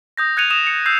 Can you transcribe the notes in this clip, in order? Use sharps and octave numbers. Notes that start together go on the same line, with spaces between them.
D#6 G6 A#6
F#6 G#6 C#7 D#7 F7
D#6 E7 F7
C#7
E6 G6 C7